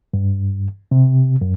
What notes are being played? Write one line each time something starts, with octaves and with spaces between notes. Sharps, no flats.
G2
C3
F#2